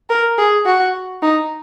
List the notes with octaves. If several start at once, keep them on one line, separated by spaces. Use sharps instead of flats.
A#4
G#4
F#4
D#4